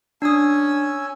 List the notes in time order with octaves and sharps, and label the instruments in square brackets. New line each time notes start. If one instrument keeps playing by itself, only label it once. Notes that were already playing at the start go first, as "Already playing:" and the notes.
[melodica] C#4 G#5 E6 [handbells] D4 D#6